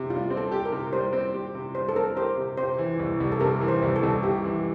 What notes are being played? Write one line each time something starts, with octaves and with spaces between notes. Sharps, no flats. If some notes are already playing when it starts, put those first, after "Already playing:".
Already playing: C3
G3 F4
C4
A4
G4
A#4
C3
G3 C5
C4
G4
C3
G3 C5
A4
C4 A#4
G4 C5
C3
C3 C5
E3
C2
C2
A4
C3 A#4
E3
C5
C2
A4
C2
C3 G4
E3